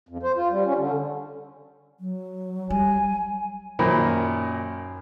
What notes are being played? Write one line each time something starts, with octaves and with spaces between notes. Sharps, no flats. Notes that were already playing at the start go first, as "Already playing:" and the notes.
F2
C5
F4
G3
C#4
D3
F#3
G3 G#5
F#2 A#2 D#3 A#4 C5 B5